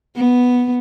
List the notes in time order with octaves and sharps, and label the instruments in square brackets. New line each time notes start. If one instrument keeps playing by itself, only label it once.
[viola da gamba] B3